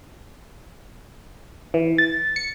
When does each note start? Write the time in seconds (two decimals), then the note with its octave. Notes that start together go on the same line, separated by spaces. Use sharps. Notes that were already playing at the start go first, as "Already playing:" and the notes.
1.74 E3
1.98 A6
2.36 C#7